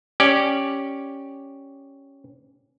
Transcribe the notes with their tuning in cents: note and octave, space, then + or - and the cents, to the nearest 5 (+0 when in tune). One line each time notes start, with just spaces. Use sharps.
C#4 +0 G4 +0 D5 +5